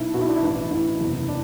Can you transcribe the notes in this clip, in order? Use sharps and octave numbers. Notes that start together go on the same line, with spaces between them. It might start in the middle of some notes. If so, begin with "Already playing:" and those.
Already playing: B1 B2 E4
B1 B2 E4 F#4
D4
E4
A1 G2 E3
A1 G2 E3 E4
F#1 E2 C3
D4